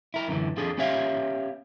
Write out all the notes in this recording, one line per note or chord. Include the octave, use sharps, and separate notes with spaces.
E4 A#4
F#2 D3 E3
F2 F3 D4 G#4 A4
B3 C#4 G4 C#5 E5 F5